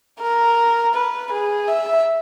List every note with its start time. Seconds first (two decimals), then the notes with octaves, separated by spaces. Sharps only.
0.20 A#4
0.94 B4
1.32 G#4
1.68 E5